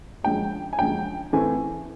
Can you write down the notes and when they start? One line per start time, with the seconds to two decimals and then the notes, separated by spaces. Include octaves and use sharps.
0.24 F#2 D3 F3 G#3 G5
0.73 G#5
0.78 F#2 D3 F3 G#3 G5
1.33 A2 E3 A3 C4 G#5